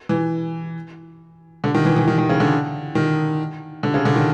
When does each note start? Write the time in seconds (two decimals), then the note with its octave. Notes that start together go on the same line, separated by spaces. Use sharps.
0.09 E3
1.64 D3
1.74 D#3
1.85 E3
1.96 E3
2.08 D#3
2.18 D#3
2.29 C#3
2.40 D3
2.95 D#3
3.83 D3
3.94 C#3
4.05 D3
4.16 D#3